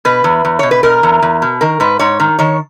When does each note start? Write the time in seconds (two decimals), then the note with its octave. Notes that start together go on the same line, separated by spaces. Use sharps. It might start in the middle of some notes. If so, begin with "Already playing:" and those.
0.05 B2 B4
0.24 E2
0.45 E2
0.59 B2 C#5
0.71 B4
0.83 B2 A#4
1.03 E2
1.22 E2
1.42 B2
1.61 D#3 A#4
1.80 G#2 B4
1.99 G#2 C#5
2.20 D#3
2.39 D#3 C#5